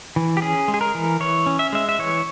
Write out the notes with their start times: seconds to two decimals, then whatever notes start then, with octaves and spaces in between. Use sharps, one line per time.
0.16 E3
0.37 G4
0.42 C#4 G#4
0.68 G#3
0.74 G#4
0.81 A#4
0.95 E3
1.20 E3 C#5
1.46 C#4
1.59 E5
1.73 G#3 E5
1.89 E5
1.99 E3 C#5